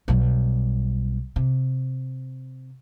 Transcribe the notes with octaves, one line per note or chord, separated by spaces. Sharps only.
B1 G3
C3